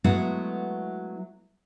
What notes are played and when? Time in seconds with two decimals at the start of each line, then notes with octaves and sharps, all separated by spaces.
0.04 F#3 G#3 A3 B3 E4 F#4